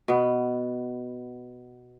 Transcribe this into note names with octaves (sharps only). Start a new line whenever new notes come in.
B2 B3